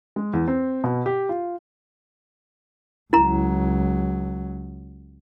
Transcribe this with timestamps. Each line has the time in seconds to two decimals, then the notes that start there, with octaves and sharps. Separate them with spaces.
0.16 G#3
0.33 E2
0.48 C4
0.84 B2
1.06 G4
1.29 F4
3.13 C#2 F#3 E4 A#5